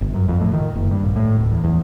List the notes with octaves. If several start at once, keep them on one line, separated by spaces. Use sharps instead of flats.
G1
F#2
F2
A2
D#3
F#1
G2
A#1
A2
D1
E2
E2